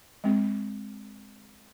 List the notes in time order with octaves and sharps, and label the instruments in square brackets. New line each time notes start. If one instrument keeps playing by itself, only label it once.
[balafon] G#3 C4